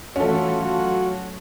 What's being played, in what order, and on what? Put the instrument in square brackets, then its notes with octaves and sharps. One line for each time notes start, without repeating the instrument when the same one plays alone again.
[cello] E3 A3 [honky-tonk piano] C#4 A4 [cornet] F4 [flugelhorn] F#4
[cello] F#3 [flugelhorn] F#4